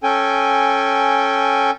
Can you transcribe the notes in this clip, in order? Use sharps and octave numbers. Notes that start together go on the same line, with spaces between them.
C#4 A4 G5 G#5